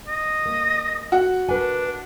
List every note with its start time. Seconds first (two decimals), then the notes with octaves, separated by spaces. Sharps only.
0.08 D#5
0.46 A#3
1.12 F#4
1.49 D4 A#4 B4 G#5